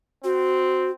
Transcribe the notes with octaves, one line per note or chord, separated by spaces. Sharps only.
C4 F#4